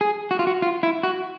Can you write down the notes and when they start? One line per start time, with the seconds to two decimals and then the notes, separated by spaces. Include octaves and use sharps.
0.01 G#4
0.31 F#4
0.39 F4
0.47 F#4
0.62 F4
0.83 E4
1.03 F#4